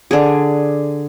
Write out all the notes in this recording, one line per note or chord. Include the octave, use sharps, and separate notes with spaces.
D3 G#4